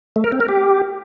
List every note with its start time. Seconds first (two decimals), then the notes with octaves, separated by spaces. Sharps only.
0.16 A3
0.24 A#4
0.32 C4
0.40 A#4
0.48 G4